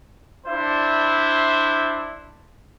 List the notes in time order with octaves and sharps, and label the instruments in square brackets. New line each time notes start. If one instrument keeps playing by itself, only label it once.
[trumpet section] D4 E4 C5 E5